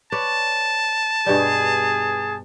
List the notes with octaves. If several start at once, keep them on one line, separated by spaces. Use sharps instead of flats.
B4 C#5 D5 A5
G2 B2 G3 G#4